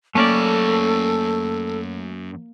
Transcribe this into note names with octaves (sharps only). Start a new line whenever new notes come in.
F#2 A3 A#3 C#4 A4 D5 A5